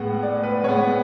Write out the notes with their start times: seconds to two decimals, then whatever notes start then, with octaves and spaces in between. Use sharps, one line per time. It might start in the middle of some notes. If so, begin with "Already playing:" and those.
Already playing: A2 G#3 B3 F#5
0.23 D5
0.43 B4
0.64 A2 G#3 B3 C#5